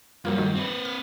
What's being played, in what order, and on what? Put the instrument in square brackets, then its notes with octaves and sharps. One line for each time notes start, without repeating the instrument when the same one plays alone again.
[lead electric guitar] G2 [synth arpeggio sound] F#3 A#3 F4
[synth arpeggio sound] D#3 F#3 A3
[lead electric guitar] C4 B4
[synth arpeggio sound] F6